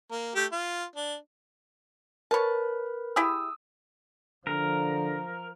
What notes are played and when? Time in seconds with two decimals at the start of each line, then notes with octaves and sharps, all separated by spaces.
0.11 A#3
0.36 A3 G4
0.52 F4
0.96 D4
2.31 A#4 B4 C#5 A5 B5
3.16 E4 G4 G#4 D#6 E6
4.47 D3 F3 A#4